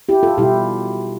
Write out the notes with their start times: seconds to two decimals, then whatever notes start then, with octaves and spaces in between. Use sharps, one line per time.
0.09 E4 G4
0.23 F4 A4
0.38 B2 G3 E4 G4